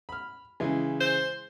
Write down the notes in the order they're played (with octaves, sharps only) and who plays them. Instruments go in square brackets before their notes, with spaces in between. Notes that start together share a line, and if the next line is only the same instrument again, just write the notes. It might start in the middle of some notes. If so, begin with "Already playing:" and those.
[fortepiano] B5 F6
C#3 E3 G#3
[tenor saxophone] C5